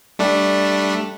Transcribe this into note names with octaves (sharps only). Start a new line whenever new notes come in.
G3 A3 D4